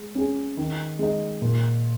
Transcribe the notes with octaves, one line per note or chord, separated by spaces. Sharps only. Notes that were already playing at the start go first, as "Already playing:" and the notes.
Already playing: G#3
C#4 G#4
D#3
G#3 D#4
A#2